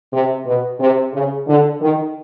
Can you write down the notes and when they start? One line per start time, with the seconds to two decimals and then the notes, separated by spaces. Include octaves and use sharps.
0.12 C3
0.46 B2
0.79 C3
1.13 C#3
1.47 D3
1.81 D#3